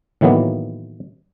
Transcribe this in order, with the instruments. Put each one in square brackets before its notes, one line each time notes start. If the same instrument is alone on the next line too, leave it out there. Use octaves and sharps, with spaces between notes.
[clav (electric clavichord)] A2 D#3 E3 F#3 A#3 B3